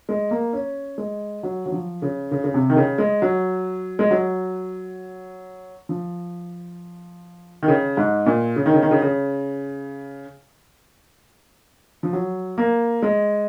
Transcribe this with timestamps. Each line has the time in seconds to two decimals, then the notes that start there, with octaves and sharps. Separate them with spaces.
0.09 G#3
0.31 A#3
0.53 C#4
0.98 G#3
1.43 F#3
1.66 F#3
1.72 F3
2.02 C#3
2.31 C#3
2.44 C#3
2.54 C3
2.70 D#3
2.77 C#3
2.98 G#3
3.22 F#3
3.99 G#3
4.11 F#3
5.89 F3
7.63 D#3
7.68 C#3
7.97 G#2
8.26 A#2
8.56 C#3
8.66 D#3
8.74 C#3
8.83 D#3
8.91 C#3
9.02 C#3
12.03 F3
12.13 F#3
12.58 A#3
13.02 G#3